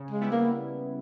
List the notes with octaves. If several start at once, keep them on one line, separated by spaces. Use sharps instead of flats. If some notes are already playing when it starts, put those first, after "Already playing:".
Already playing: C#3
G#3
G3 B3 E4
A#3